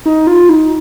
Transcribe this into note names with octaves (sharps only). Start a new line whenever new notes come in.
D#4
F4
D#4